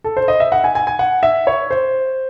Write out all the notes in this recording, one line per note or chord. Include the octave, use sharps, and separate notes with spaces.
A4
C5
D#5
E5
F#5
G#5
G#5
G#5
F#5
E5
C#5
C5